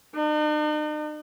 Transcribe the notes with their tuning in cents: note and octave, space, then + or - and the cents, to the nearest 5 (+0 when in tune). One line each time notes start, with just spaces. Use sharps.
D#4 -45